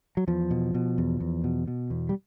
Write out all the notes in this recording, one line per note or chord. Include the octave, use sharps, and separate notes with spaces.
F#3
E2 F3
B2
B2
E2
E2
B2
B2
E2
G3